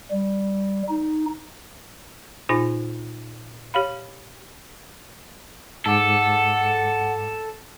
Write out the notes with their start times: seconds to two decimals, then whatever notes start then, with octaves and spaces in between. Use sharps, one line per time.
0.11 G3
0.89 D#4
2.49 A#2 D#4 F4 C5 G#5 A#6
3.74 G4 C#5 F5 B5
5.86 G#2 A4 F#5 D6